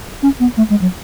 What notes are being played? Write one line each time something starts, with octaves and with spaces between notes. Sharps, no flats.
C#4
B3
A3
G#3
F#3